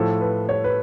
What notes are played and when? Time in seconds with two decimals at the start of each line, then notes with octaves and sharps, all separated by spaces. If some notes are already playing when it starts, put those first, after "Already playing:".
Already playing: A2 F3 A4
0.21 B4
0.49 C#5
0.64 B4